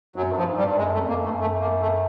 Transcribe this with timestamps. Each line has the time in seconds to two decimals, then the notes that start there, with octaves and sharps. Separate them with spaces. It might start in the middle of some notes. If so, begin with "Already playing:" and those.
0.16 F#2 F#3
0.32 G2
0.37 F3
0.47 G#2
0.57 G3
0.63 G2
0.78 F#2 G#3
0.94 A3
0.99 F2
1.09 A#3
1.19 F#2
1.24 G2 A3
1.34 F#2
1.40 A3
1.60 A#3
1.81 A3